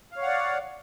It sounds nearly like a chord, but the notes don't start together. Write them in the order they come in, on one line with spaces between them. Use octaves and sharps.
F5 C#5 F#5 D5